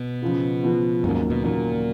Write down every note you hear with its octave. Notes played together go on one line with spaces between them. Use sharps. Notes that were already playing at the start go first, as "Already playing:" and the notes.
Already playing: B2
C#3 F3 B3 F4
C#3 F3 B3 F4
D#2 G#2 C#3 F#3 A#3
B2
D#2 A#2 C#3 F#3 A#3